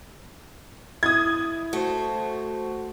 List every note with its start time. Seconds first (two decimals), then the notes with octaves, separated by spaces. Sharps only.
1.03 E4 D#6 G#6
1.73 A3 F#4 C5